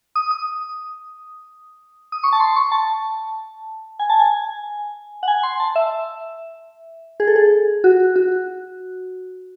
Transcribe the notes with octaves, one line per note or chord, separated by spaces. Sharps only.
D#6
D#6
D#6
C#6
A5
C6
C#6
A5
G#5
A5
G#5
F#5
G#5
C6
A5
E5
G#4
A4
G#4
F#4
F#4